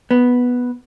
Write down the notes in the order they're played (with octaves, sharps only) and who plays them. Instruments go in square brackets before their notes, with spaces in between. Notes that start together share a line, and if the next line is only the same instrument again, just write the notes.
[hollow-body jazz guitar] B3